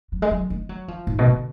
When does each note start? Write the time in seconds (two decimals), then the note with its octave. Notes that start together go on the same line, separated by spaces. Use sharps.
0.12 F#3
0.22 G#3
0.31 F#3
0.50 G#3
0.69 F#3
0.88 F3
1.07 G#2
1.19 B2
1.26 D3